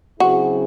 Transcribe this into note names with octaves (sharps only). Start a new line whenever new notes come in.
C#3 F#3 C4 E4 F#4 G#4